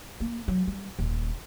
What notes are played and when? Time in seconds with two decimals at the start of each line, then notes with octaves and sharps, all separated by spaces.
0.20 A#3
0.48 F#3
0.67 G3
0.99 D#1